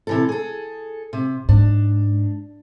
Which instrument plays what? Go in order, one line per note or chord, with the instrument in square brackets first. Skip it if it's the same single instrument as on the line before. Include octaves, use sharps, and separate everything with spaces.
[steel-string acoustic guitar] C3 E3 A4
G#4 A4
C3
[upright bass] G#2 [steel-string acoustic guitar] D4